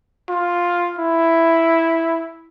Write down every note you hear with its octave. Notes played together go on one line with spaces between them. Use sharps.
F4
E4